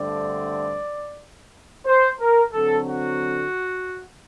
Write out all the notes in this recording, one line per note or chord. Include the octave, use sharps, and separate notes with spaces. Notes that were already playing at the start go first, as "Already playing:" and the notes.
Already playing: G2 D3 A3 C4 D5
C5
A#4
D3 F#3 C4 A4
F#4